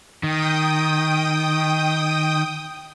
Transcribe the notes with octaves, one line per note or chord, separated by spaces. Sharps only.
D#3 G5 D#6